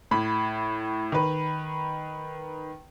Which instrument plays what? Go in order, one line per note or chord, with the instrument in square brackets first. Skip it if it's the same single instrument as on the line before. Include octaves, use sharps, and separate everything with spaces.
[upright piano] A2 B5
D#3 B4